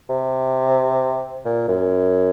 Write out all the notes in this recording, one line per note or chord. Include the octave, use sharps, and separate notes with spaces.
C3
A#2
F#2